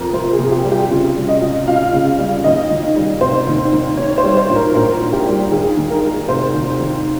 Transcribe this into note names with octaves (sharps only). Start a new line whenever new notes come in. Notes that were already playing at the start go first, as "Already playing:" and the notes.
Already playing: F2 C3 A#4
F2 C5
G#4
C3
G4
G3
G4
C#3 F4
G3
D#5
C#2
C#2 F5
C#3
G3
D#2 D#5
D#3
G3
F1 C5
D#2
D#3
G#2 C#5
C5
G3
C5
A#1
A#4
A#1 A#4
G#2
G4
G3
D#2 G#4
D#3
A#4
G#3
F1 C5
D#2
D#3